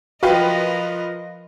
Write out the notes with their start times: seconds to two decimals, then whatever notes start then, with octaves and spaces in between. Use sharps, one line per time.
0.23 F3 F4 F#4 A#4 B4 D#5 F5 G5